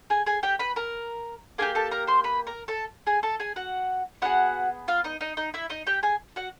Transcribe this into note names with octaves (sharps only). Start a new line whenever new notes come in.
G#4 G#5
G#4 G#5
G4 G5
B4 B5
A#4 A#5
A#3 D4 G4 G#4 G#5
A4 A5
A#4 A#5
C5 C6
B4 B5
A#4 A#5
A4 A5
G#4 G#5
A4 A5
G#4 G#5
F#4 F#5
B3 D#4 F#4 G#4 F#5
F4 F5
D#4 D#5
D#4 D#5
D#4 D#5
E4 E5
D#4 D#5
G4 G5
G#4 G#5
F#4 F#5